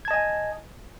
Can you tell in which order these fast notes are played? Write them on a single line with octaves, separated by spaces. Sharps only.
G#6 A5 D#5 G#5